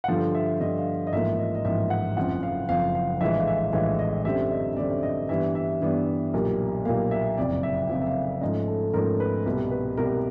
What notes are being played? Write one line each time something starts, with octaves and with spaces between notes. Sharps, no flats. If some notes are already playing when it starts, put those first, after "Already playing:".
F#5
G2 D3 F3 F5
E5
G2 D3 F3 D#5
F5
D#5
A1 G#2 F3 A#3 E5
D#5
D#5
A1 G#2 F3 A#3 E5
F#5
F#1 F2 C#3 F3 F#5
F5
F#1 F2 C#3 F3 F5
F5
A#1 A2 E3 G#3 E5
F5
E5
A#1 A2 E3 G#3 F5
D#5
F#2 D3 G3 C4 E5
D#5
F#2 D3 G3 C4 D5
E5
D#5
G2 E3 G3 B3 D4 E5
E5
G2 E3 G3 B3 D4
B1 A#2 G3 A#3
B1 A#2 G3 A#3 F5
E5
F#1 F2 C3 D5
E5
F#1 F2 C3 F5
E5
F5
G#2 F3 A3 C#4 D#5
A4
G#2 F3 A3 C#4 A#4
B4
C2 B2 G3 B4
B4
C2 B2 G3 A#4